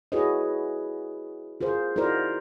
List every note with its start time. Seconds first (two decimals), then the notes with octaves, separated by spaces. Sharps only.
0.12 E4 F#4 G#4 B4 C#5 D#5
1.61 F4 G#4 A#4 C5
1.96 D#4 E4 F#4 A#4 C5 D5